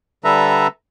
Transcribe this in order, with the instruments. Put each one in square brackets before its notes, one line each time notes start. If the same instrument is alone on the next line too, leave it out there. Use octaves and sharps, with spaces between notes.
[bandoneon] D3 G3 A4 B4 E5 A#5